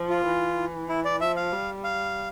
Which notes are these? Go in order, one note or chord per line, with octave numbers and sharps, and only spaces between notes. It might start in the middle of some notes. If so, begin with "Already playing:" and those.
Already playing: F3
F4
E3
E4
D5
F3 E5
F5
G3
F5